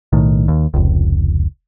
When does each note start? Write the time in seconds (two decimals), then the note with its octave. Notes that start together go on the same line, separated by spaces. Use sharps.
0.13 B1 A2 D#3
0.48 D#2
0.74 F1 C#2